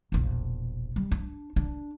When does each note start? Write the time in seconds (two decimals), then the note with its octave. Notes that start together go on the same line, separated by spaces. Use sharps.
0.12 E1 A#1
0.96 G3
1.11 D4
1.56 D4